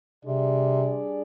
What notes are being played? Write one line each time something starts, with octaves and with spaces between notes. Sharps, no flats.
C3 G3 D4 G#4 D5